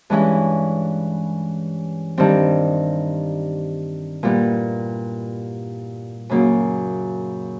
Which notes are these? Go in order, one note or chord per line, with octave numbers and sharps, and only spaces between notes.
G2 E3 G#3 C#4 E4
G2 D#3 G3 C4
A#2 G3 B3 E4
F#2 C#3 F#3 A#3